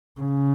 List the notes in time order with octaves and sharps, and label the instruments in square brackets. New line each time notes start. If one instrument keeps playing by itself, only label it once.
[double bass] C#3